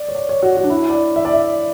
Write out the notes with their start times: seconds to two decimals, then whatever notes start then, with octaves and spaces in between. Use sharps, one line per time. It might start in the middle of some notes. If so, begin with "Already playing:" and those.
Already playing: D5
0.09 C#5
0.15 D5
0.29 C#5
0.43 F#4
0.57 F#4
0.64 D4
0.70 E4
0.90 D5
1.16 E5
1.25 D5
1.33 E5